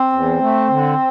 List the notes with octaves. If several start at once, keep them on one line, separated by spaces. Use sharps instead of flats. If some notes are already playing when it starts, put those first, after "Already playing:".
Already playing: C4
E2
A3
D3